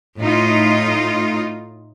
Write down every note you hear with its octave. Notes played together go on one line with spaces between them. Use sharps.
A2 D#4 F4